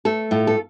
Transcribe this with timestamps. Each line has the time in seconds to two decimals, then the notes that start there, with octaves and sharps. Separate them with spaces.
0.05 A3 A4
0.31 A2 F4
0.47 A4